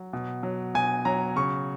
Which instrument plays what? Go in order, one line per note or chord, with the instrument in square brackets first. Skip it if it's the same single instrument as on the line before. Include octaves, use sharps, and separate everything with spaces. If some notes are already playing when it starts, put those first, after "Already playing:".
Already playing: [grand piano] F#3
B2
F#3
B2 G#5
F#3 A#5
C#3 C#6